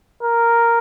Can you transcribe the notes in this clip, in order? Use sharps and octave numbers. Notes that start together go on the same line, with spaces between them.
A#4